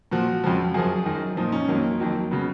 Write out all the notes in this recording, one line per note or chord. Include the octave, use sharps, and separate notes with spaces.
A#2 F3 F#4
F2 C#3 F3
F#2 F3 G#4
F#2 D#3 F#3
A#2 F3 D#4
C#4
F2 D#3 F#3 A#3
F2 D#3 F#3
C#3 F#3 B3